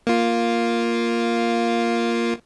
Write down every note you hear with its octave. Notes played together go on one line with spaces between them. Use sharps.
A#3 F4